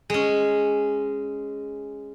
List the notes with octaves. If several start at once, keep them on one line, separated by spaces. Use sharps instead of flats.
G#3 C#4